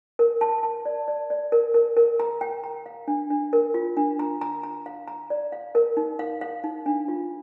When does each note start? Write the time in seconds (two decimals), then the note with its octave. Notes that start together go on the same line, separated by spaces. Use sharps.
0.19 A#4
0.41 A5
0.63 A5
0.85 D5
1.08 D5
1.30 D5
1.52 A#4
1.74 A#4
1.97 A#4
2.20 A#5
2.41 G5
2.64 A#5
2.86 F5
3.08 D4
3.30 D4
3.53 A#4
3.74 F4
3.97 D4
4.19 A#5
4.41 A#5
4.63 A#5
4.86 F5
5.08 A#5
5.30 D5
5.52 F5
5.75 A#4
5.97 D#4
6.19 F5
6.41 F5
6.64 D#4
6.86 D4
7.08 F4